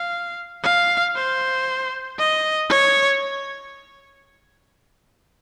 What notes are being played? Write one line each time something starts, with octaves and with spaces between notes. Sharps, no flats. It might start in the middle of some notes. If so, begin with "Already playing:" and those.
Already playing: F5
F5
C5
D#5
C#5